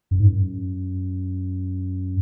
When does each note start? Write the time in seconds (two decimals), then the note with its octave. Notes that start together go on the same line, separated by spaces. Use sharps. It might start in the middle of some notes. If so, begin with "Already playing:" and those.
0.11 F#2
0.20 G#2
0.28 F#2